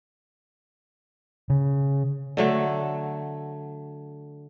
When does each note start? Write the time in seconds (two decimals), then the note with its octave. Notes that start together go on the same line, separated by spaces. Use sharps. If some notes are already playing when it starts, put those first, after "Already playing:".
1.50 C#3
2.37 D3 F#3 A3